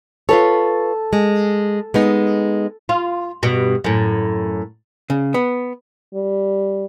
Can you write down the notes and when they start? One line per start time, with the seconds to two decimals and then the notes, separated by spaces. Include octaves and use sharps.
0.29 F4 A4 B4 C#5
1.13 G#3
1.94 G#3 B3 D#4
2.89 F4
3.43 G2 B2
3.84 F#2 A2
5.10 C#3
5.34 B3
6.14 G3